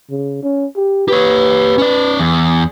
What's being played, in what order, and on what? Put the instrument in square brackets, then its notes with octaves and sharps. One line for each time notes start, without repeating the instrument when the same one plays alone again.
[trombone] C#3
C#4
G4
[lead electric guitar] G4 C#5 [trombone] B4
[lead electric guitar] C#4 D5
E2